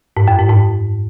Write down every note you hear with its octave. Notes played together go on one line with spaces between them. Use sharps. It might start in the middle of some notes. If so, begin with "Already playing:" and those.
G#2
F#2
G#2
G#2